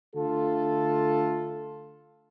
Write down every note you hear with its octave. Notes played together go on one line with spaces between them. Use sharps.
D3 A3 F4 A4